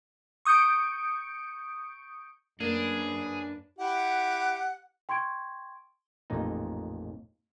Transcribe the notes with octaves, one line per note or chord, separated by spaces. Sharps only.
C#6 D#6 G6 C#7 D7
F#2 A#3 D4 G#4 B4
E4 G4 F#5
G5 C6 C#6 G#6 D7
A1 F2 A#2 D#4